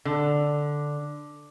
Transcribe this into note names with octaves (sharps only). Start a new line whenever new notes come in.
D3